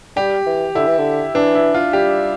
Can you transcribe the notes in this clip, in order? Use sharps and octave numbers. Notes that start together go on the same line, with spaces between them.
G3 G4
E3
D3 E4
E3
D3
E3 D4
E4
F4
G3 G4